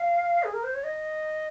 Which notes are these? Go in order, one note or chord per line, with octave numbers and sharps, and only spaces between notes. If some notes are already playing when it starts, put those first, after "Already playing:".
Already playing: F5
G#4
A#4
C5
C#5
D#5